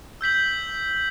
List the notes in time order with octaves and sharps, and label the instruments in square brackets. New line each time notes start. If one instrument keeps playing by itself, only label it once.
[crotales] E6 G6 B6 F#7